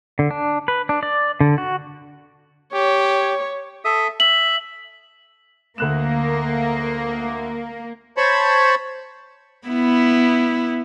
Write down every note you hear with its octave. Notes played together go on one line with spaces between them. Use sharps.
D3
D4
B4
D4
D5
D3
F#4
G4 C#5
A4 E5 D#6
E5 F#7
D2 A#3 F#6 E7
C5 C#5 A5 B5 C#6
B3 E4